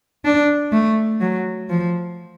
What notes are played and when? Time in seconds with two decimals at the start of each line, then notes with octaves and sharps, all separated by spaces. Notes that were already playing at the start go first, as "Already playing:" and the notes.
0.25 D4
0.72 A3
1.21 F#3
1.69 F3